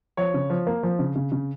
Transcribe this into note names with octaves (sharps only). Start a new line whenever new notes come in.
F3 C#5
C#3
F3
A#3
F3
C#3
C#3
C#3